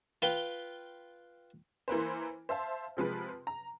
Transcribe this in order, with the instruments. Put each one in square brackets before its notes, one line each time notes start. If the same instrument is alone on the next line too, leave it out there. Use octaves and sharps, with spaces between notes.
[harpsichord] F4 B4 G5
[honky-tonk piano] E3 A#3 B4 C5
C5 E5 F5 A5
C3 F3 G#3 B4
A#5